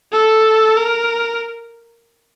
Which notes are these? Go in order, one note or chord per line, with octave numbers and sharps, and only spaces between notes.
A4
A#4